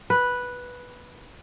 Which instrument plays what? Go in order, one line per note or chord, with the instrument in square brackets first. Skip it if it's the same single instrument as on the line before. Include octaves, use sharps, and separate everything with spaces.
[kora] B4